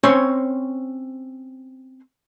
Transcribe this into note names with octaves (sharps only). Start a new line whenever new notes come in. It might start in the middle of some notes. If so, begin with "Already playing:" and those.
C4 C#4 C5 C#5 B5